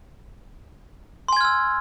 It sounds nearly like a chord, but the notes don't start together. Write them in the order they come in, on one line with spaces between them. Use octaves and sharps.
C6 G#5 G#6 F6 E6